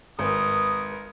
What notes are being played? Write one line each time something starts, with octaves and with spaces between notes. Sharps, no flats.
G#1 A#4 B4 D#6